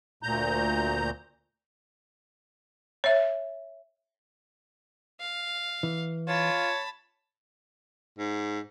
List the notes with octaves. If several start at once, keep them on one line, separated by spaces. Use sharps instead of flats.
D2 A#2 A#5 G6
C#5 E5
F5
E3
F4 C#5 A5 B5
G#2